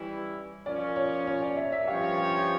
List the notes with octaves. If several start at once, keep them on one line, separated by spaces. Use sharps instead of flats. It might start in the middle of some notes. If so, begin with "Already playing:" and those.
Already playing: E3 G3 C#4 E4
F3 A#3 C#4 D5
C#5
C#5
D5
E5
E5
G2 F3 C#4 G4 C#5 F5
F5